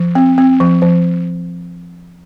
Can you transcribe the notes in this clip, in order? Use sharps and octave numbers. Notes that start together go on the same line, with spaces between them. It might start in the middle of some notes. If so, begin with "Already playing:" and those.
Already playing: F3
C4
C4
F3
F3